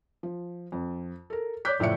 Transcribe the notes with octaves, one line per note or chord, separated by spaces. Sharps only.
F3
F2
A4 A#4
C#5 D5 D6 F#6 G6 B6
F#1 A2 F3 D5 E5 C#7